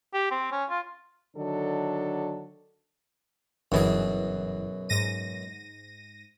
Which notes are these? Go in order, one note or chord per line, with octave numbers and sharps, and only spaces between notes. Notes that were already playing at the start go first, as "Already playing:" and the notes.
G4
C4
C#4
F4
D3 D#3 F#3 D4 A4
G1 F#2 B2 E3 G#4
G#2 A#6 D#7